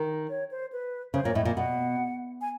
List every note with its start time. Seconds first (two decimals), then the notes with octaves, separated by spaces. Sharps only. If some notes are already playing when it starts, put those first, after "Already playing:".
Already playing: D#3
0.30 C#5
0.51 C5
0.72 B4
1.14 C#3 C5
1.24 A#2 C#5
1.35 A2 D#5
1.45 A#2
1.57 B2 F#5
2.41 G#5